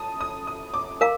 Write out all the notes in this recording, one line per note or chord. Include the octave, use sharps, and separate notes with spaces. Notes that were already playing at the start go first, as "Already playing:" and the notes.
Already playing: A5 D#6
D#6
D#6
D6
A#4 F5